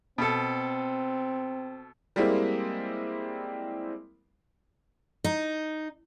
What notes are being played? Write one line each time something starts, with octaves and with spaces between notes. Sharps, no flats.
B2 C4 A4
G3 G#3 A#3 C4 E4
D#4